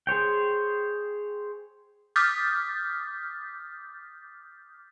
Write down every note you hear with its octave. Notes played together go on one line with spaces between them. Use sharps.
G#4 C5 C#5 G5
D6 D#6 F6 G6 A6 B6